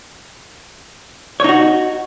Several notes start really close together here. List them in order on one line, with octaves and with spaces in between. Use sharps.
C#5 D#4 F#4